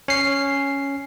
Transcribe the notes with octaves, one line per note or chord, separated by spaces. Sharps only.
C#4 C7